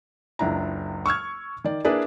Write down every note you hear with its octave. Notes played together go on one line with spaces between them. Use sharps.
F#1 C#2 D4 E4 A#5
C#6 E6 F6 G#6
D#3 D5
A#3 D4 E4 G#4 B4 D5